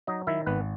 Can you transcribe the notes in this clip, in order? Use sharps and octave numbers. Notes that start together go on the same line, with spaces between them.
F#3 D#4 D#5
D#3 E4 E5
G#1 B3 B4